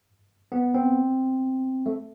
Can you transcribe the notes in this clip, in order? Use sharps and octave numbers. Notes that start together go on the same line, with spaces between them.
B3
C4
A3